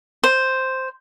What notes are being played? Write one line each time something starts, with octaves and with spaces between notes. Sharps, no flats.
C5